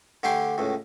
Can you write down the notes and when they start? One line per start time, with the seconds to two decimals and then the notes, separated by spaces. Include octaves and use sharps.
0.23 D3 A3 G4 G#5 C6
0.58 C#2 A2